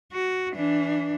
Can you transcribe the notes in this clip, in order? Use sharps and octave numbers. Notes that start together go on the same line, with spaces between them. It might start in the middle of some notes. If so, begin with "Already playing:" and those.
F#4
E3 D4